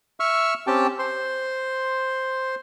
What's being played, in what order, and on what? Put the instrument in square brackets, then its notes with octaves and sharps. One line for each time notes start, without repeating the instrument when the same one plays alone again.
[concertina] E5 C#6 E6 F6
C4 C#4 G4 G5 A5
C5 C6